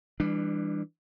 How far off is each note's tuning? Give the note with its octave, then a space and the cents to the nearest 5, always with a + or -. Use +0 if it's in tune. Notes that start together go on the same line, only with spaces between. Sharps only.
E3 +0 G3 +40 D4 +15